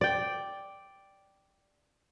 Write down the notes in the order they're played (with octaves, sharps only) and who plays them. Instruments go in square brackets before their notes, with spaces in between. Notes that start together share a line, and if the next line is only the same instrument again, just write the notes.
[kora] D5 G5